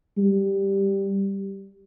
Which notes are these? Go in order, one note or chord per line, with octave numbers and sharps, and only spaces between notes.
G3